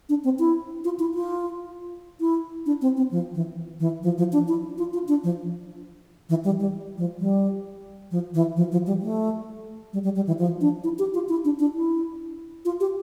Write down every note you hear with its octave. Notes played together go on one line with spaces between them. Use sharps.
D4
C4
E4
F4
E4
F4
E4
D4
C4
C4
F3
E3
E3
F3
F3
D4
E4
F4
F4
D4
F3
E3
G3
G3
F3
G3
F3
E3
F3
F3
G3
A3
G3
G3
G3
E3
F3
D4
E4
G4
F4
E4
D4
D4
E4
F4
G4